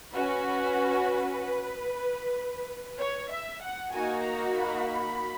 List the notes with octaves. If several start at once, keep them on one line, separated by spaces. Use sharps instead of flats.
C#4 F#4 B4
C#5
E5
F#5
A#3 D#4 F#4 G#5
A#5
B5